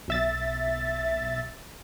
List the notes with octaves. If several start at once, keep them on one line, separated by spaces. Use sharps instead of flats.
B1 E5 A6